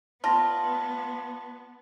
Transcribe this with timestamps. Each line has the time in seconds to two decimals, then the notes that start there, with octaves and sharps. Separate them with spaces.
0.24 G3 B3 F4 A5 A#6